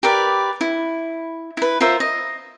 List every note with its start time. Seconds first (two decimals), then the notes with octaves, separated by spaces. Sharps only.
0.03 G4 A#4 B4 D5
0.61 E4
1.57 E4 B4
1.81 F4 A#4 C5 E5
2.00 D#5